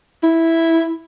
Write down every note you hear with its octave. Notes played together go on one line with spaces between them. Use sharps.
E4